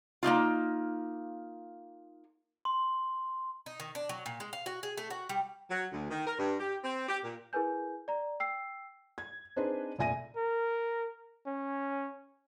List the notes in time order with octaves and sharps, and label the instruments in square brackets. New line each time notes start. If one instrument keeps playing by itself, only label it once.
[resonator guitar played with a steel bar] A#3 C4 D#4 F4
[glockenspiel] C6
[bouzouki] D#4
D#3
D4
F#3
A#2
G#3
F5
F#4
G#4
A3
F#4
G3
[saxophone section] F#3
D2
D#3
A#4
G2
G4
C4
G4
A#2
[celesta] E4 G#4 A#4 B4 G#5 G6
D5 A#5
G5 E6 C7
[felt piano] G#6
C4 D4 D#4 G#4 B4 C5
F1 A#1 E5 G#5 A#6 D#7
[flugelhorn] A#4
C#4